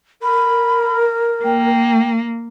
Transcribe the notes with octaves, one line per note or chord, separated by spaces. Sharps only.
A#4 B5
A#3 G5